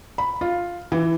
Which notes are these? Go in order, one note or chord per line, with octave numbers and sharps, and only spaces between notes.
B5
F4
E3